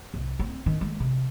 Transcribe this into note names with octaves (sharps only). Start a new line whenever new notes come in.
C2
C4
D#3
G#3
C3